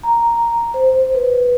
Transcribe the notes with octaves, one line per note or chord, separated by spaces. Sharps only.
A#5
C5
B4